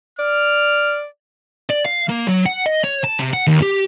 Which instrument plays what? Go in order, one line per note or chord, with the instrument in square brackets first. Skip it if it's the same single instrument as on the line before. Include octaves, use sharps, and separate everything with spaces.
[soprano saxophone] D5 [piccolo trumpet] F6
[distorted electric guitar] D5
F5
A#3
F#3
F#5
D#5
C#5
A5
C3
F#5
D#2
G4